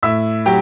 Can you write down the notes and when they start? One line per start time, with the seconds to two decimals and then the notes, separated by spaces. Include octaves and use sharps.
0.03 A2 E5 E6
0.46 F#3 G4 G5